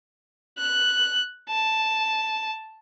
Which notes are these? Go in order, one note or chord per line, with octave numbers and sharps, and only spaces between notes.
F#6
A5